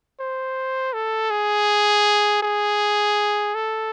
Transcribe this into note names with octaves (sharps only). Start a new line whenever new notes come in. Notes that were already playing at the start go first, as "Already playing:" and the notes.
C5
A4
G#4
G#4
A4